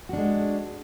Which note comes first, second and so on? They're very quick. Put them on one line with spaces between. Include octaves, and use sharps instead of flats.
F#4 D4 G#3